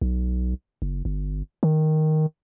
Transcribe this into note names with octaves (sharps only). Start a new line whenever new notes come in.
B1
F#1
G1
D#3